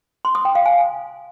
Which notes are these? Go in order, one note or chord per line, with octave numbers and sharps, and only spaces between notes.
C6
D#6
G5
F5
G#5